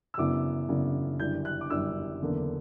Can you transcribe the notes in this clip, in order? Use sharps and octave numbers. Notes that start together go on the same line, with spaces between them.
E6
F#2 C#3 E3 B3 D4 D6
F#2 C#3 E3 B3 D4
G1 F#2 E3 G3 G6
F#6
D6
G1 F#2 E3 G3 E6
F#1 E2 D3 A#3